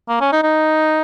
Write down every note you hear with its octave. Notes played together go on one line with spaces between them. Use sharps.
A#3
C#4
D#4
D#4